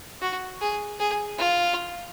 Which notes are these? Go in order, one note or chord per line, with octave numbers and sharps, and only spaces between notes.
F#4
G#4
G#4
F4